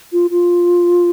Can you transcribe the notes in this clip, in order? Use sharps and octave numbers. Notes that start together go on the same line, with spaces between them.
F4
F4